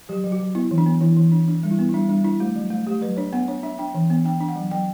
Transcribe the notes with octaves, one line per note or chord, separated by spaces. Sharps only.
F#3 G4
F#3
F#4
F#3
B3 E4
E3
D4
B3
E3 E4
E3
D4
D4
G3
E4
B3
E4
G3 D4
G3 D4
D4 E4
A3 F#4
F#3
A3
A3 G4
F#3 B4
D4 C#5
B3 F#5
D4 C#5
D4 E5
D4 G5
E3
B3
D4 G5
D4
F#5
F#3
F#3 G5